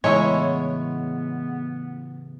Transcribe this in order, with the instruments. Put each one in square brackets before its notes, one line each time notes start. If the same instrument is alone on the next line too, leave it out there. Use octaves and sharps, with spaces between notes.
[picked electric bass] A2 C#3 E3 [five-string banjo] G#3 E4 [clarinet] B3 [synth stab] C#5